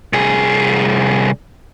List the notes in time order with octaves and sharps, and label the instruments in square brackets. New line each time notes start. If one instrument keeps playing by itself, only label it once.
[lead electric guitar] C2 G#4